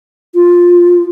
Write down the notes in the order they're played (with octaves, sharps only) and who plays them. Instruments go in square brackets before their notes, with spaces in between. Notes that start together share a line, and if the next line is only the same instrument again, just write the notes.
[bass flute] F4